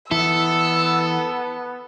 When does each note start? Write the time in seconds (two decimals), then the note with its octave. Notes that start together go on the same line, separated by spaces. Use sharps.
0.11 E3 B3 E4 A4 E6